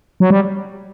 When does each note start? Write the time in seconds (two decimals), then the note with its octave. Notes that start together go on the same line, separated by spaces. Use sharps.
0.20 F#3
0.30 G3